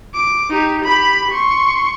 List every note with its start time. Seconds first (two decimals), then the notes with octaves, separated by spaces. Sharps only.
0.14 D6
0.50 D#4 G4
0.84 G4 B5
1.31 C6 C#6